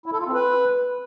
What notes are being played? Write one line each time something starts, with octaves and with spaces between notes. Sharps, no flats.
E4
A4
F4
C4
B4